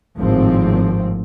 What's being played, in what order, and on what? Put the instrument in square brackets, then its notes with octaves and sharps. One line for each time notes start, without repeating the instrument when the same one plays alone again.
[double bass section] G#1 A2 F3 C4